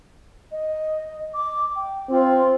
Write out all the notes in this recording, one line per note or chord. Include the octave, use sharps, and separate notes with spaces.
D#5
D6
G5
C4 F4